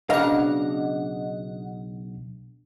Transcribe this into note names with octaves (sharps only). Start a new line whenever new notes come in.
B1 C#3 D4 D#5 F5 F#5 A#5